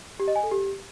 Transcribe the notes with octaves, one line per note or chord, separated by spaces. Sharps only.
G4
D#5
G#5
A4
G4